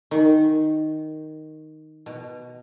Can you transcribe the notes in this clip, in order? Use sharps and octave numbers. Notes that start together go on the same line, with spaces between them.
D#3
B2